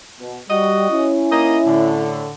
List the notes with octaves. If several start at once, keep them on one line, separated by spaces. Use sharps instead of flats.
B2
G3 F#4 D#5
C#4 E4
A#3 D#4 D#5
A2 D3